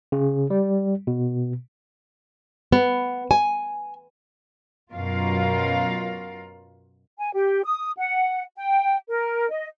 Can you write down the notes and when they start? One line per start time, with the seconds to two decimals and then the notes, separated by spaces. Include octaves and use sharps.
0.12 C#3
0.50 G3
1.07 B2
2.72 B3
3.31 G#5
4.92 F#2 B2 F4 A#4 F5
7.18 G#5
7.34 G4
7.64 D#6
7.97 F#5
8.57 G5
9.08 A#4
9.49 D#5